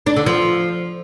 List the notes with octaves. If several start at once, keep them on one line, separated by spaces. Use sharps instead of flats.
D4
D3
F3